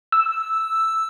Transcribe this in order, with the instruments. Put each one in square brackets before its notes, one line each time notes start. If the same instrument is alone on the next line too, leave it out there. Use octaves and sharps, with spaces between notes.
[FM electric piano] E6